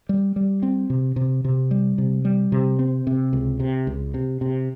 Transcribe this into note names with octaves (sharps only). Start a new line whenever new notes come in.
G3
G3
C4
C3
C3
C3
G3
C3
G3
C3
C4
C3
C#2
C3
C#2
C3
C3